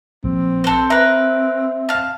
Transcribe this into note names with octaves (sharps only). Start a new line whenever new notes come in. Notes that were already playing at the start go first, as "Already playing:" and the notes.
A#1 C4
A4 C5
A#4 B4 E5
F5 A5